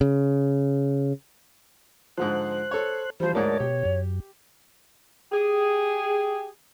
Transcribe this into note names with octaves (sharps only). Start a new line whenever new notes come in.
C#3
G#2 D3 F3 C5 F#6
A4 C#5
E3 F3 G3 C5
D2 G#2 A#4 C#5 D5 A5
B2 G4
F#2
G4 G#4